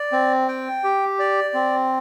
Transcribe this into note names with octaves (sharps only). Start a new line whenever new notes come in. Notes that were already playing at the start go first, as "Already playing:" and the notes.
Already playing: D5
C4
G5
G4
D5
C4